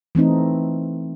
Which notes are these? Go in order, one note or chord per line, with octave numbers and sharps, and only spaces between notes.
E3 A3 C4 D#4